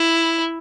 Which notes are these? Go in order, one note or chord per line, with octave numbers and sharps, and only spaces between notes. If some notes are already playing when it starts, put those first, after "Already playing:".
Already playing: E4